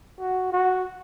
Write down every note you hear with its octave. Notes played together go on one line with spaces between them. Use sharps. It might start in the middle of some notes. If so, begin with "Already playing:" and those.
F#4
F#4